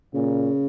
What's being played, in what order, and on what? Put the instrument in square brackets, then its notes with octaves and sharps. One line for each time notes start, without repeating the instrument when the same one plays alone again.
[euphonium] A#2 [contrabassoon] C#3